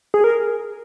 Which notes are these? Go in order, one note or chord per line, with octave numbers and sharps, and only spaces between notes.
G#4
A#4